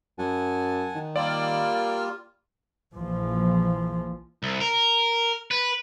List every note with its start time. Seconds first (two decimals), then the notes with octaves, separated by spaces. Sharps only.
0.18 F#2 F#5 G#5 A5
0.95 D#3
1.16 G3 A#3 F4 A#4 D5 E6 F6
2.94 A#1 E3 F3
4.43 C2
4.60 A#4
5.51 B4